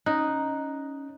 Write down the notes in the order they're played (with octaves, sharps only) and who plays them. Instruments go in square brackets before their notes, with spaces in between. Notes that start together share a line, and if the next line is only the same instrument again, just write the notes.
[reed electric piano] C#4 F#6 [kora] D#4